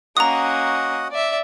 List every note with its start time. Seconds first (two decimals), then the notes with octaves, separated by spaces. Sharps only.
0.17 A#3 C#4 F#4 D#5 F#5 A#5 D#6
1.11 D5 E5